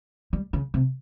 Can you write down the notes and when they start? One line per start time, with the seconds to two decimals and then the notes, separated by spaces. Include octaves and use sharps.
0.33 G3
0.53 C#3
0.74 C3